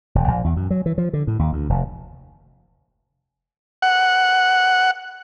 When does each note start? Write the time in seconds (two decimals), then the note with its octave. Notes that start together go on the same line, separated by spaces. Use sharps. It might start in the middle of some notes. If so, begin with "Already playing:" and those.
0.15 E1
0.28 A#1
0.44 E2
0.56 F#2
0.70 F#3
0.86 E3
0.98 F3
1.13 D3
1.27 A2
1.39 D#2
1.53 D2
1.69 F1
3.82 F#5